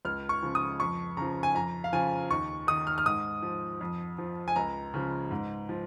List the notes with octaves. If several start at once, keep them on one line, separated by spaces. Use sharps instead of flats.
C#2 F6
C#6
C#3 F3
D#6
F2 C#6
C#3 F3 A#5
G#5
F2 A#5
F5
C#3 F3 G#5
D#2 C#6
D#3 D#6
F6
F6
G#2 D#6
F3
F2
F3
G#5
C#2 A#5
C#3 F3
G#2
F3